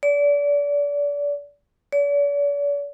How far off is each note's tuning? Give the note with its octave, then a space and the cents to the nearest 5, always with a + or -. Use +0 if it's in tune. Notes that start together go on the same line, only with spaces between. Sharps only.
D5 -30
D5 -45